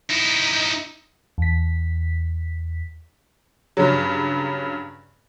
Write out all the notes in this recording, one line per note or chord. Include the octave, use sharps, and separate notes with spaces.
D#4 E4
E2 B6
G2 C#3 F#3